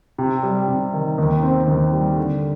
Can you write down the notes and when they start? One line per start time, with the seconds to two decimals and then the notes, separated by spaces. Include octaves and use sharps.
0.18 C3
0.43 G3
0.68 C3
0.94 D#3
1.18 D#2
1.43 C4
1.67 D#2
1.93 G3
2.17 D3